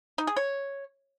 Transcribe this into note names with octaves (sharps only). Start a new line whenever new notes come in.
D#4
G#4
C#5